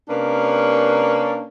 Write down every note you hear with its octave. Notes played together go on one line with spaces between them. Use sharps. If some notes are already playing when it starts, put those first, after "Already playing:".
C3 A#3 C#4 D4 A#4 B4